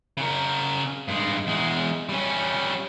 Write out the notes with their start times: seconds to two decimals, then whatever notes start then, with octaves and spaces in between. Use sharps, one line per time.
0.17 C#3 A#4
1.08 G2 G#3
1.47 E2 G#3
2.09 G3 C#4